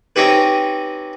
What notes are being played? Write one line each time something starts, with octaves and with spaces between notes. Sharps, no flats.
C4 C#4 D#4 G4 B4